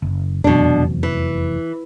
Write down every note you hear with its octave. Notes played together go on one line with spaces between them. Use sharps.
F#1
F1 E2 B2 F#3 D4
E3